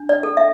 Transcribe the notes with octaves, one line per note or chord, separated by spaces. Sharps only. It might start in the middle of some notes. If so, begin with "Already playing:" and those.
Already playing: D4
D5
A4
E5